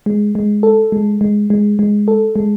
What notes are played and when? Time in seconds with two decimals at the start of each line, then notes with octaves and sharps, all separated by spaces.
0.06 G#3
0.35 G#3
0.63 A4
0.92 G#3
1.21 G#3
1.50 G#3
1.79 G#3
2.08 A4
2.36 G#3